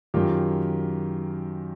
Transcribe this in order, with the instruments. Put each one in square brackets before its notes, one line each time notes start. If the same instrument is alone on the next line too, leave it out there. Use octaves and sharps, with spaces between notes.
[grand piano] F#2 D#3 F4 G4